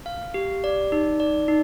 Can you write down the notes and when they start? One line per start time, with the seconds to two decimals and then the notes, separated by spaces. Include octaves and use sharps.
0.06 F5
0.34 G4
0.64 D5
0.92 D#4
1.20 D5
1.48 D#4